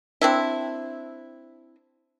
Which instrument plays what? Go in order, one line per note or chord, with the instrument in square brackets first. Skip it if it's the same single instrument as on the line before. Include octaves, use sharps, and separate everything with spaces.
[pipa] C4 D4 E4